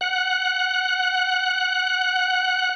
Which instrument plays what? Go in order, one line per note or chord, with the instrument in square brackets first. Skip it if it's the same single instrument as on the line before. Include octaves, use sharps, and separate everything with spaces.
[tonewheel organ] F#5 F#6